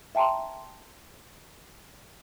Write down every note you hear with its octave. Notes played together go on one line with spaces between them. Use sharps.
E5 G5 A5 A#5 C6